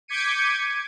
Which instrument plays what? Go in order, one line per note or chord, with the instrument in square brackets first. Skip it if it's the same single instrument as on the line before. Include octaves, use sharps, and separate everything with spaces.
[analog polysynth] D6 G6 G#6 B6 C#7 D#7